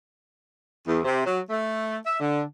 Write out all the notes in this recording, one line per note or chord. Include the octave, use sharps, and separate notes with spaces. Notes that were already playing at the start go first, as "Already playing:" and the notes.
E2
C3
F#3
A3
E5
D3